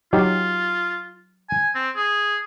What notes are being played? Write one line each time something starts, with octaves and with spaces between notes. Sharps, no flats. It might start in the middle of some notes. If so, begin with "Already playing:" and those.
F#3 D#4 F4 G4
G#5
C4
G#4